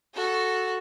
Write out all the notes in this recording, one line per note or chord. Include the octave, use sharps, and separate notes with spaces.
F#4 A4